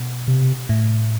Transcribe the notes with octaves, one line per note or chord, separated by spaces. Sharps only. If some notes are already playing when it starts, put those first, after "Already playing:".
Already playing: B2
C3
A2